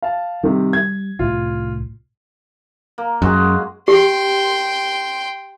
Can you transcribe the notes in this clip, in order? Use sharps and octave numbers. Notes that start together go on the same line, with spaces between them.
F5 A5
C3 D#3 G3
G#6
C2 A2 F4
A#3
F#2 G#3 F#4 G#4
G4 G5 C6